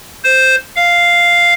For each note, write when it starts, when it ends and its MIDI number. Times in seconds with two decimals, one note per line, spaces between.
0.24 0.55 72
0.76 1.54 77